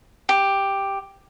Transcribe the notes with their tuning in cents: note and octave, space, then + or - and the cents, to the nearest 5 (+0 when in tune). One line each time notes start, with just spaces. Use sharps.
G4 +5